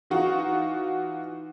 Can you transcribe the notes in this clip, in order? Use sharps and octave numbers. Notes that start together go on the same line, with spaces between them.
E3 D#4 F4 F#4